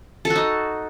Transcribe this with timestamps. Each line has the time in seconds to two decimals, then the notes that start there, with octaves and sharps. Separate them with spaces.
0.25 A4
0.30 F#4
0.36 D#4